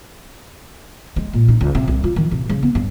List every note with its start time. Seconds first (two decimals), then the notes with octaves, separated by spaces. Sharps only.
1.16 G#3
1.33 A#2
1.48 D#4
1.61 C#2
1.75 C3
1.88 C2
2.04 F4
2.16 D#3
2.31 C3
2.49 C#3
2.63 B3
2.75 G2